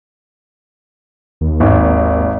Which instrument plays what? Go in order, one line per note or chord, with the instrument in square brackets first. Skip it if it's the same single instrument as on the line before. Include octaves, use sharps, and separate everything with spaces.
[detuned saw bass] D#2
[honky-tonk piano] G#1